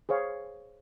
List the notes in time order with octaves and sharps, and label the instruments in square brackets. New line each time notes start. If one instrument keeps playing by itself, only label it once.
[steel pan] G#4 C5 C#5 F5